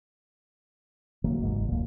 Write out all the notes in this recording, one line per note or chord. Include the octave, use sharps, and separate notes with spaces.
C#3 E3 F#3 A#3
G#1 E2 G#2
D1 A#2